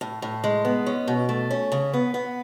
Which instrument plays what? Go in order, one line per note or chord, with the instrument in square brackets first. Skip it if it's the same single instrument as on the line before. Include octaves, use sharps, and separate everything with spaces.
[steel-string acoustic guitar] A2
A2
G#3
B3
C#4
B2
A3
C#4
C#3
B3
B3